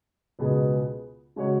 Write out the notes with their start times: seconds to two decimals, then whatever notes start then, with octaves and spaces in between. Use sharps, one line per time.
0.39 C#2 B2 B3 G#4
1.36 C#3 G#3 C#4 F#4 C#5